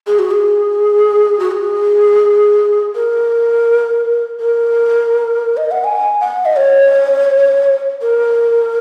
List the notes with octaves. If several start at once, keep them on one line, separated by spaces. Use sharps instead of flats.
G#4
F#4
G#4
F#4
G#4
A#4
A#4
D#5
F#5
G#5
F#5
D#5
C#5
A#4